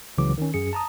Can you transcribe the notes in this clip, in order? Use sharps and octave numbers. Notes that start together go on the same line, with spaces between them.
C#2 C#3 E3 F#3 D6
D#3 C#4
F#2 G#4 C#7
A5 A#5 D#6